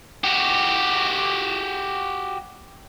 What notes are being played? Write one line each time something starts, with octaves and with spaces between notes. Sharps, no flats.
F#4 G4